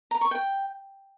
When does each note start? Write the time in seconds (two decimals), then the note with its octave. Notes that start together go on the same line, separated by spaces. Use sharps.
0.11 A#5
0.21 C#6
0.31 G5